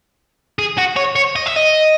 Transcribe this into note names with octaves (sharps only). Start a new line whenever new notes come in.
G#4
F#4
C#5
C#5
D#5
E5
D#5